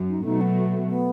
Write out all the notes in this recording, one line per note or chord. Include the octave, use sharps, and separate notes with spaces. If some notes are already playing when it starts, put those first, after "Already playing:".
Already playing: F#2
D#4
B2 F#3 A3 D#4
B3
B3